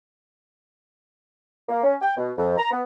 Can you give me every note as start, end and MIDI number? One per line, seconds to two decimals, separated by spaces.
1.69 1.83 58
1.83 1.95 61
2.02 2.17 79
2.17 2.31 47
2.38 2.55 41
2.58 2.71 82
2.71 2.81 59